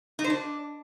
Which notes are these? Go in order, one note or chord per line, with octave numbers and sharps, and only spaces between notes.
D#4
C5
D4